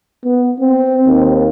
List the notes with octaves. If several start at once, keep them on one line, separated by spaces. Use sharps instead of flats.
B3
C4
D#2